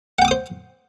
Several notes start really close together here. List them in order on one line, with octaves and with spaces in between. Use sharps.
F#5 G5 D6 D#6 C5